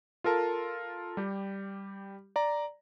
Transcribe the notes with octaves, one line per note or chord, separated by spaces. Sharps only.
F4 A4 A#4 A5
G3 G4
D5 A#5